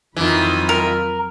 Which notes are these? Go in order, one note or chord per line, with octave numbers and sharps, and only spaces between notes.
F2 D#3 E3 F#3 F4 B5
A#4